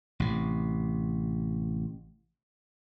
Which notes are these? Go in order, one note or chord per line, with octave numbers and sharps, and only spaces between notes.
A1 C3